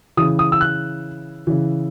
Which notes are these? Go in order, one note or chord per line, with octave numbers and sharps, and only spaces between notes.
C#3 E3 D#6
D#6
E6
F#6
C#3 E3